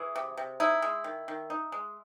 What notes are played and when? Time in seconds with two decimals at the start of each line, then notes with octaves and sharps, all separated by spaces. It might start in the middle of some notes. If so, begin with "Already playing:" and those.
Already playing: E3 G#4
0.16 C3
0.37 C3
0.60 D#4 E4
0.82 G#3
1.04 D#3
1.28 D#3
1.50 D#4
1.72 G#3